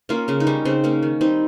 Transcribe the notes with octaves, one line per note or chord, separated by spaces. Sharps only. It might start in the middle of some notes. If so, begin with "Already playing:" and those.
A#3 C#4 F4
C#3 C#4
D#4
G3 C#4
C#3 C4
A#3 C#4
D#3
G3 C4 D#4